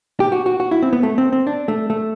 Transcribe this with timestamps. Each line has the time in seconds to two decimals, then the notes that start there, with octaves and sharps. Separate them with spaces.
0.20 G4
0.32 F#4
0.46 F#4
0.60 F#4
0.71 E4
0.82 C4
0.93 B3
1.03 A3
1.18 C4
1.33 C4
1.47 D4
1.68 A3
1.90 A3